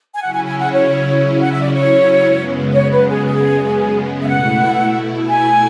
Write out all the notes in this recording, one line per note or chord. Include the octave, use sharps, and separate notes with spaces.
G#5
C#3 F#3 C#4 E4 F#5
G#5
G#5
F#5
C#5
F#5
E5
D5
C#5
F#2 C#3 G#3 B3
C#5
B4
G#4
G#4
E5
B2 A3 E4 F#5
G#5